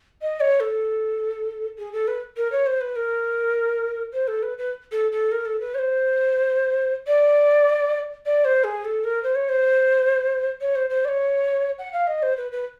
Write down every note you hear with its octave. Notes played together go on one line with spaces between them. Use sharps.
D#5
C#5
A4
G#4
A4
B4
A#4
C#5
C5
B4
A#4
C5
A4
B4
B4
A4
A4
A#4
A4
B4
C#5
C5
D5
D5
C5
G#4
A4
A#4
C5
C#5
C5
C#5
C5
C5
D5
C#5
F#5
F5
D#5
C5
B4
B4